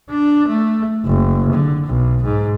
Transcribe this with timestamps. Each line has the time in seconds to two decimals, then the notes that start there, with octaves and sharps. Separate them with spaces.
0.10 D4
0.47 A3
1.06 F#1
1.52 D3
1.87 B1
2.24 G#2